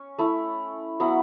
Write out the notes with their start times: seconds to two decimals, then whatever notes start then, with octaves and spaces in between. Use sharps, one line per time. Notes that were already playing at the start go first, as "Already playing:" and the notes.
Already playing: C#4
0.18 A3 E4
1.00 F#3 B3 E4 F#5